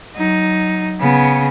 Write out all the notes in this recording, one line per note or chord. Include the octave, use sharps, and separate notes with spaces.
F#3 D#4
C#3 B3